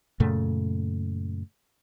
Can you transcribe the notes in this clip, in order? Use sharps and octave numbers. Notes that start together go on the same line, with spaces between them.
F#2 A#2 C#3 A3